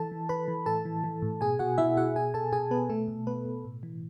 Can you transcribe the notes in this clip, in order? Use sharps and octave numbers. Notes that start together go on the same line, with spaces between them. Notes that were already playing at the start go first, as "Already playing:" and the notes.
Already playing: E3 A4 A5
E3
E3 B4 B5
E3
A2 A4 A5
E3
E3
A2
B2 G#4 G#5
B2 F#4 F#5
B2 E4 E5
B2 F#4 F#5
B2 G#4 G#5
B2 A4 A5
B2 G#4 G#5
B2 B3 B4
B2 A3 A4
B2
B2 B3 B4
B2
A2
E3